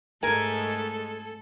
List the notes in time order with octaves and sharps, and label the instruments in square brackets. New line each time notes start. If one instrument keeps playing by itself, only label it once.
[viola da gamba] G#2 G#3 A3 [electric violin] A4 [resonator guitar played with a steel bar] A#4 [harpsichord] G#5